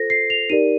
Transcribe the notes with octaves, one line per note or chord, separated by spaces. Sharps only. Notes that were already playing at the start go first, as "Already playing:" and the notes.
Already playing: F4 A4 C5 A#6
C7
F7
D#4 G4 A#4 D5 D#7